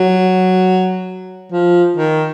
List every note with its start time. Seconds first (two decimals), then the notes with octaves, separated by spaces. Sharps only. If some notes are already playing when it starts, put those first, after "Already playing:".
Already playing: F#3
1.52 F3
1.97 D#3